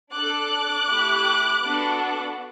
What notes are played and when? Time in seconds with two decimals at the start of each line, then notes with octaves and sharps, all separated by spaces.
0.12 D4 A4 D6 F#6
0.87 A3 E4 G4
1.63 B3 D4 F#4 A4